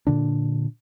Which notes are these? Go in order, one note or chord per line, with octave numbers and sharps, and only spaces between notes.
A#2 D3 D4